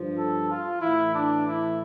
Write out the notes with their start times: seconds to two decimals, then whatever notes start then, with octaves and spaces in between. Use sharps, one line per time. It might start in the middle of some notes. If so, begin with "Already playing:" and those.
Already playing: G2 F3
0.16 A4
0.48 F4
0.81 A2 E3 E4
1.13 D4
1.45 E4